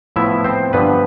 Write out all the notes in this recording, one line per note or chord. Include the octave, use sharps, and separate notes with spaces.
A2 F3 B3 E4 E5
C4 C5
G2 D3 F3 B3 B4